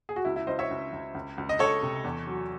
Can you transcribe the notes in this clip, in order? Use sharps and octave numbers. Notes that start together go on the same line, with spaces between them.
G#4
F#4
C#2 E4
E4
C#2 C5 D#5
C#5 E5
C#2
C#2
C#2
C#2
D#5
C#2 A4 C#5
C3
E2
F#3